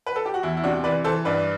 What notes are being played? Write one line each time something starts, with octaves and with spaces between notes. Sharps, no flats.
B4
A4
G4
F#4
E2 E4
E4
C3 D4 F#4
E3 B4 D5
E3 A4 C5
G2 B4 D5